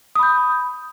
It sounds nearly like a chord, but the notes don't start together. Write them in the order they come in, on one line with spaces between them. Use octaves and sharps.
D#6 B5 G6